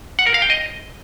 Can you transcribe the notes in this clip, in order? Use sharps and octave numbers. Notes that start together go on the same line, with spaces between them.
F#5
A#4
F5
G5
D#5